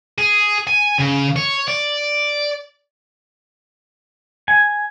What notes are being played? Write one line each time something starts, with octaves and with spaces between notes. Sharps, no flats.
G#4
G#5
C#3
C#5
D5
G#5